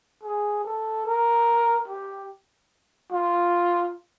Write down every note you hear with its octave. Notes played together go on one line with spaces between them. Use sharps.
G#4
A4
A#4
G4
F4